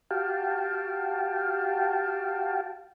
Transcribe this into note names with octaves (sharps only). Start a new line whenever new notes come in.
F#4 G4 F5 G5 A5